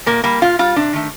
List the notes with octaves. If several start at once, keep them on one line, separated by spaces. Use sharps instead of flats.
A#2 A#3
G3 A#3
A#2 F4
G3 F4
C3 D4
D#3 A3